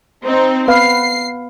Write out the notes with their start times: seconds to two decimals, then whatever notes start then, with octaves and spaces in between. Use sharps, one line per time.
0.25 C4 D#4
0.68 B3 B4 F5 C7